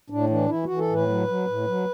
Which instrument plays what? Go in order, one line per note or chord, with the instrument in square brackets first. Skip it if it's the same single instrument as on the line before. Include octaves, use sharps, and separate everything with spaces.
[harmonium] A2 D4
E3 D4
E3 E4
E3 F#4
A4
A2 B4
F#3
F#3
A2
F#3